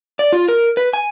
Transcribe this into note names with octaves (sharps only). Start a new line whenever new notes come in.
D5
F4
A#4
B4
G#5